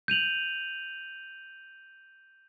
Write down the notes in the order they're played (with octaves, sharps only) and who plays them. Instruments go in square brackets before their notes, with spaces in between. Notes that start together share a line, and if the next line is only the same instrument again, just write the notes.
[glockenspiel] G6 D#7 F7 F#7